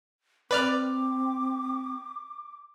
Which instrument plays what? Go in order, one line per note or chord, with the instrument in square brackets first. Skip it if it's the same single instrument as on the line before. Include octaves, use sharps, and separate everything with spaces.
[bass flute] C4 [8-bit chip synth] B4 D5 F6 [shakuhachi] D6